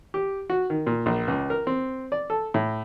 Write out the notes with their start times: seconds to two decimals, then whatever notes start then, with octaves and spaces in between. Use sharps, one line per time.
0.14 G4
0.50 F#4
0.70 D#3
0.87 A#2
1.06 A#1
1.28 C#2
1.50 A#4
1.67 C4
2.12 D5
2.30 A4
2.54 A2